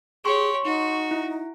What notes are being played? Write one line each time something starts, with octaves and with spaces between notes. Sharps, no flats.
G4 G#4 C#5 C6 C#6
D#4 F#4
E4